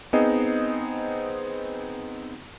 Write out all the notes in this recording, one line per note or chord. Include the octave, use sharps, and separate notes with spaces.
B3 C4 D#4 G#4 C5 D#5